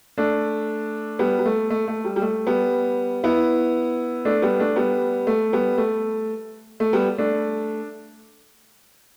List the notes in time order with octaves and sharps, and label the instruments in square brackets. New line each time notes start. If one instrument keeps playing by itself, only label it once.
[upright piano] A3 D4
G3 B3
G3
A3
A3
A3
G3
G3
A3
G3 B3
B3 E4
A3 D4
G3 B3
A3 D4
G3 B3
A3
G3 B3
A3
A3
G3 B3
A3 D4